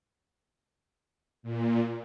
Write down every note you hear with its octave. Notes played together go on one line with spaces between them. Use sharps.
A#2